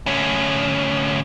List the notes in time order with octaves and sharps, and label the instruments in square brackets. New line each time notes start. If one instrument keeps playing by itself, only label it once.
[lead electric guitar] D2 C#4